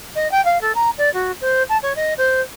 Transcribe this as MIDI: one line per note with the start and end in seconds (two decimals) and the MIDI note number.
0.15 0.30 75
0.31 0.43 79
0.45 0.60 77
0.61 0.72 69
0.75 0.90 82
0.98 1.11 74
1.13 1.31 66
1.41 1.62 72
1.69 1.77 81
1.82 1.93 73
1.96 2.14 75
2.17 2.41 72